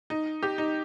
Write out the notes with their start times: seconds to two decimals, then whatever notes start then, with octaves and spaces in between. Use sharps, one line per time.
0.10 D#4
0.43 G4
0.58 D#4